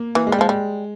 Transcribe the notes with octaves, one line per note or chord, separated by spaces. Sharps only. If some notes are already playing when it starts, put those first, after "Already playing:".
Already playing: A#3
E3 A#3
G#3
G3
F3 G#3
G3